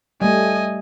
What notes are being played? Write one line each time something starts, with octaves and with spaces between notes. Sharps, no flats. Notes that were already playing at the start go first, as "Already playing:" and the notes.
G3 A3 D#5 G#5